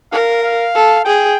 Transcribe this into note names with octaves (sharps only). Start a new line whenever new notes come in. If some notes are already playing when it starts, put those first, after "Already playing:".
A#4 F5
F5
A4
G#4 G5